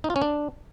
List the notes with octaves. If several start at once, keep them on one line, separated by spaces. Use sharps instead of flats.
D#4
F4
C#4
D4